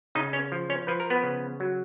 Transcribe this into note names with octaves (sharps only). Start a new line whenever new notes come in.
C#3 D#4 D#5
C#4 C#5
F3
C#4 C#5
F3 B4
A#4
B3 B4
C#3
F#3